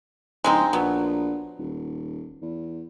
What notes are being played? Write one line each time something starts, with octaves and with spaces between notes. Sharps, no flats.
D1 G#3 C4 D#4
A#1 F#3 B3
D#1
E2